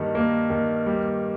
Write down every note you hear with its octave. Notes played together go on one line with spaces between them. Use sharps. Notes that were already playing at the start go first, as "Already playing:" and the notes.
Already playing: G2 D#3 G3 A#3
A#3
D#3
G3